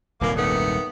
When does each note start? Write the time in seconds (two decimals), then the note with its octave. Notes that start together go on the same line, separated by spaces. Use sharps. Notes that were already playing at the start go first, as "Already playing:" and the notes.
0.21 D#1 C2 F#2 E3 A#3 D6
0.37 D#3 A3 B3 D#6